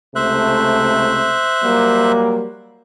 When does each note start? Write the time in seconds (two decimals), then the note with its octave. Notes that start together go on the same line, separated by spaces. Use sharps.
0.16 C#2 C3 A3 C5 E5 F#6
1.64 F#3 G3 A#3